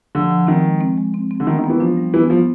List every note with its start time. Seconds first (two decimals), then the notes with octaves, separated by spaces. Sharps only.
0.15 D3 F3
0.31 F3
0.47 D#3 C4
0.64 G#3
0.81 C4
0.98 G#3
1.14 C4
1.31 C4
1.40 D3
1.47 D#3 B3
1.59 D#3
1.64 B3
1.70 E3
1.80 F3 D4
1.97 G3
2.14 E3 B3
2.30 F3 B3